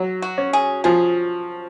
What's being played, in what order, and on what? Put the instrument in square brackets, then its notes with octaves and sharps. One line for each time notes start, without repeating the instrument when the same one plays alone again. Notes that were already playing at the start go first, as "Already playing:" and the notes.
Already playing: [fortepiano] F#3
[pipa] F#4
[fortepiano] C#4
[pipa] G#4
[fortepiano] F3 [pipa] G#4